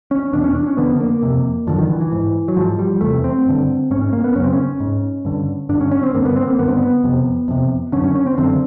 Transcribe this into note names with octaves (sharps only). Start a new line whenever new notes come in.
C#4
E2 B2 D4
C#4
D4
C#4
F2 D3 B3
A#3
F2 C3
F#2 D3 F3
D#3
E3
E3
G#2
F#3
G#2 F3
G3
E2 C3 A3
C4
G2 D3
G#2 C#4
C#4
A#3
B3
F#2 C#3 C4 C#4
C#4
G#2
G2 D3
G2 D3 D4
C#4
C#4
C4
G2 D3 A#3
B3
C4
A#3
G2 D3 B3
C4
B3
F2 C3
F2 C3
F#2 D3 C#4
C#4
C#4
C4
F#2 D3 C4